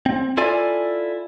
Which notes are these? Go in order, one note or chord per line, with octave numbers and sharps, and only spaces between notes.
C4
E4 F4 A4 D5 G#5